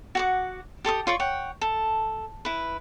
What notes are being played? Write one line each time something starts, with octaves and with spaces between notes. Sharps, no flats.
F#4 F#5 D6
G4 A4 C#6 D#6
F4 C#5 D5 C#6
C#5 F#5 G5
A4
E4 B4